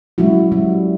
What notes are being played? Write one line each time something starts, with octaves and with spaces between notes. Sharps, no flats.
F#3 G#3 C#4 E4 F#4
G3